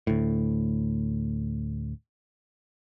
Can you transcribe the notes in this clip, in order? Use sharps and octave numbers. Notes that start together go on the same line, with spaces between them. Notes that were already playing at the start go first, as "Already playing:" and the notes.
D2 A2